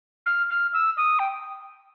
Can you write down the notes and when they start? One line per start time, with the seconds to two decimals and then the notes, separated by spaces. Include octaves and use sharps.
0.26 F6
0.50 F6
0.73 E6
0.97 D#6
1.19 G5